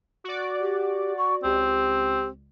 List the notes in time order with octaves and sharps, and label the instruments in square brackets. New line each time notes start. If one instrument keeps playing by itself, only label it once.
[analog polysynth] F#4 D5
[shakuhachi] G4
C#6
[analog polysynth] C#2 [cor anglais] C4 [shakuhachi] G4